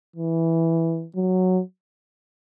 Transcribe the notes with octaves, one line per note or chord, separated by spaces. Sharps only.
E3
F#3